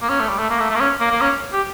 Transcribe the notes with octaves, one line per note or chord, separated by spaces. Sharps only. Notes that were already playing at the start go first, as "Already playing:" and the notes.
A#3
C#4
A3
G3
A3
A#3
A3
A3
A#3
C#4
A#3
A#3
C#4
G4